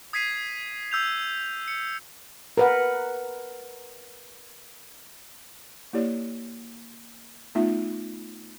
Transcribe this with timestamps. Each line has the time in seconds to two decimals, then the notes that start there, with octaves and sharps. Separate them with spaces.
0.13 D#6 G#6 B6 C7 D#7
0.92 D#6 E6 G6 F7
1.68 C#7
2.57 A#4 B4 F#5
5.93 A#3 E4 G4 C#5 D5
7.55 A3 B3 D#4 F4 E5